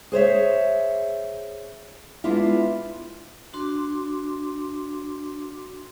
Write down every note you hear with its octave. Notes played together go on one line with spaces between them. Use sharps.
G#4 C5 C#5 E5
G#3 B3 D4 E4 F4
D4 F#4 C6 D6